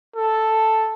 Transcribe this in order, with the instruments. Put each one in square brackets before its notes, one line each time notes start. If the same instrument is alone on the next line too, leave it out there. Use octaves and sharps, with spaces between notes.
[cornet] A4